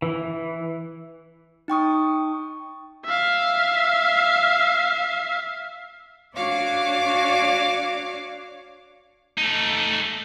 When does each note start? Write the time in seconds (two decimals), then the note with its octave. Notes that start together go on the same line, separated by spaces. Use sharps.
0.02 E3
1.68 D#4 G5 C#6 D#6
3.05 E5 F5
6.35 D4 F#4 C#5 D5 F5 D6
9.38 A3 D#4